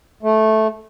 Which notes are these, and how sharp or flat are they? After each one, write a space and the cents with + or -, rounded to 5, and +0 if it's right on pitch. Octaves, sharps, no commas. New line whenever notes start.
A3 -10